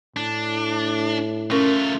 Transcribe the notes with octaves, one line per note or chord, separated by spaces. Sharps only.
A2 D4
A3 C#4 F4 A#4